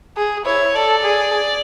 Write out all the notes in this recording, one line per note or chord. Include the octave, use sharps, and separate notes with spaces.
G#4
E4 C#5
A4 D5
G#4